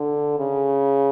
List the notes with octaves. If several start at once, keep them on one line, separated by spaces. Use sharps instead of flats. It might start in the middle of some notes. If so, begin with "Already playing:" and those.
Already playing: D3
C#3